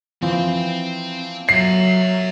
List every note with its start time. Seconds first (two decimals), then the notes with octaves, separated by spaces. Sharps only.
0.22 E3 F3 C4 C6
1.49 F#3 C#5 E5 C7